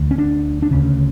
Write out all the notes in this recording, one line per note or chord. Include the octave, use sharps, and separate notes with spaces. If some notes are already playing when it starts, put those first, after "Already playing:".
Already playing: D2 D3
C#4
D4
D4
D2 C#3 C#4